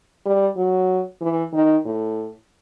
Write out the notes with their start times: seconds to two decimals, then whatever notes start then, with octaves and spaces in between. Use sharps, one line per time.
0.25 G3
0.57 F#3
1.21 E3
1.53 D#3
1.85 A2